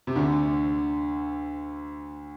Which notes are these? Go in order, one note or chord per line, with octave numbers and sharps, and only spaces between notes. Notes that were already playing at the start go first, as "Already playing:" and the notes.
C3
D2 D3